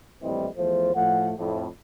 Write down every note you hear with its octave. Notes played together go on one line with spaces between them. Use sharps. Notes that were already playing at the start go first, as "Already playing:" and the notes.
A#1 A2 E3 G3 C4 D#5
E2 F3 A3 C5
A2 F3 A3 F#5
F2 A2